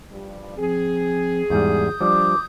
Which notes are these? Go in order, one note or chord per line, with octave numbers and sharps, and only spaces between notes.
G2 F3 G3
F3 C4 G#4
E2 G#2 G3 D#6 G6
F3 G3 D4 D6